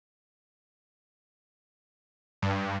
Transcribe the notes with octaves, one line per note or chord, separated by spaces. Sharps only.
G2